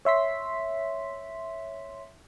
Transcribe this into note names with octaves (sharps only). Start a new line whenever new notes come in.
C#5 E5 C6 B6